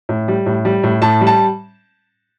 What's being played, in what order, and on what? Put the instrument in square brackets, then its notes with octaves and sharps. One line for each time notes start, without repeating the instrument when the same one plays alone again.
[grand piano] A2
G3
A2
G3
A2
A2 A5
G3
A5